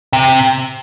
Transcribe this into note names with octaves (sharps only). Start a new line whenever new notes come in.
C3